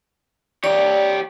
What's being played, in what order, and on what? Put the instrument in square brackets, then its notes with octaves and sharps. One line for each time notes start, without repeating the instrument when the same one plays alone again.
[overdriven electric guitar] G4 C#5 [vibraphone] D5